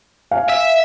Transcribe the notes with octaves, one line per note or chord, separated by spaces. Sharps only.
F5 G#5
E5